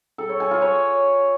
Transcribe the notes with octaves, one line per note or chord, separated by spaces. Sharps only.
A4
C#5
G#5
F4
C#5